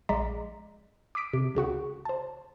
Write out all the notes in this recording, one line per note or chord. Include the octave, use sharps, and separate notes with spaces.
A#1 G#3 D5 A#5 B6
D6 D#6 B6 D7
C3
C#2 C#3 F#4 F#5
C5 A5